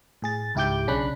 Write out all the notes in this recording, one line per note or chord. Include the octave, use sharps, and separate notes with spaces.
A2 G#4 A6
C#2 G#2 E4 G4 D6 G6
B1 C#3 C#4 D4 B5 F#6